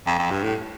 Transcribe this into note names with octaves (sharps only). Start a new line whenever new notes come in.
F2
F2
G2
A2